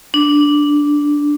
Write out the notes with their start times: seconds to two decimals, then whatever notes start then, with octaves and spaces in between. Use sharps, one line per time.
0.14 D4